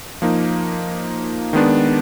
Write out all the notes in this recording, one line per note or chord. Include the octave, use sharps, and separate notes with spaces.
F3 A#3 D#4
D#3 G#3 B3 D4